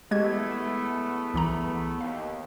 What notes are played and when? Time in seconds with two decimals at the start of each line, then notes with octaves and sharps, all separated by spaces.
0.11 E2 G#3 A3 B3 G4 G#6
1.34 C2 E3 A#5
2.01 D#2 F5